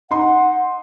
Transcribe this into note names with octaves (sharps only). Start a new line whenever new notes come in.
D#4 F#5 C6